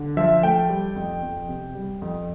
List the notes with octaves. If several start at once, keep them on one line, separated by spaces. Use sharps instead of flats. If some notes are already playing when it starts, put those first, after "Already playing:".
Already playing: D3
F3 E5
A3 G5
G3
F2
F2
C3
G3
F2